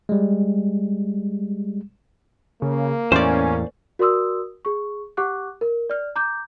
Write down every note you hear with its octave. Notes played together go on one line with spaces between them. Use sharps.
G3 G#3
C#3 A#3
E2 A2 C#4 C5 D5
F#4 A#4 D5 C6 D#6 E6
G#4 C#6
G4 F#5 C#6 D6 F#6
A#4
D5 F6
A#5 D6 G6